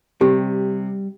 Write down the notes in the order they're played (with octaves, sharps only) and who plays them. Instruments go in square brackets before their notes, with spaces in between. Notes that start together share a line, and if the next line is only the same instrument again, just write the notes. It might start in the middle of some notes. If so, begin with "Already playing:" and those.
[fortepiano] C3 [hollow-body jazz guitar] G3 [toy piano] G4